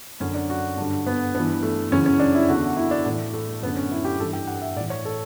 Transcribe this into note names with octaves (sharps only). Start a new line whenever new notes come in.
F#2 D3 C#4
D4
F#4
G2 D3
B3
G2 B3
E3
A3
F#2 C#3 E3 C#4
C#4
D4
E4
E2 D3 F#4
E4
D4
A2 E3
A3
F#2 B3
D3
C#4
E4
G4
G2 E3 A4
G5
F#5
E5
A2 E3 D5
C#5
A4